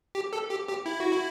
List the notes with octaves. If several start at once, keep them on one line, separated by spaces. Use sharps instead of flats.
G4
A4
G4
G4
E4
F#4
E4